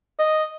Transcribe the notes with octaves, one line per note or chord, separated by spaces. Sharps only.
D#5